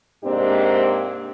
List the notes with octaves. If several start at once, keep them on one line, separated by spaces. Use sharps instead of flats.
G#2 C3 A#3 C4 D4 G4